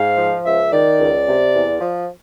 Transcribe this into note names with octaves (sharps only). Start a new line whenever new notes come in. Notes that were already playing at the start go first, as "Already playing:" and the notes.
Already playing: G#2 F5
F3
C#2 E5
D#3 D5
C#2
C3
E2
F3